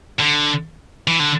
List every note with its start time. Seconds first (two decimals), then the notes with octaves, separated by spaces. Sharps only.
0.20 D3
1.07 E3
1.20 D3